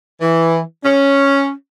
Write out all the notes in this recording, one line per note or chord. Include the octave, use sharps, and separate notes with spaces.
E3
C#4